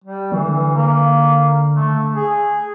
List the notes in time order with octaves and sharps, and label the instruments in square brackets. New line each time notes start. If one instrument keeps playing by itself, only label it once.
[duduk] G3
[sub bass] D3 [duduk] E3
[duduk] A#3
A3
G#4